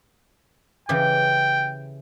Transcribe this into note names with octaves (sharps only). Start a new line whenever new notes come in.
C#3 E3 G4 G5